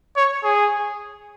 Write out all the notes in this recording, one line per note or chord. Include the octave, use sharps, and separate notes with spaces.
C#5
G#4